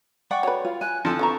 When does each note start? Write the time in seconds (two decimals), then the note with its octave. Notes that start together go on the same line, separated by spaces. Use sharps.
0.31 D5 F#5 G5 C#6
0.43 F#3 B4 C#5
0.65 F4
0.81 G#5 F#6
1.05 F3 C4 E4 A4
1.19 D3 B3 A#5 C#6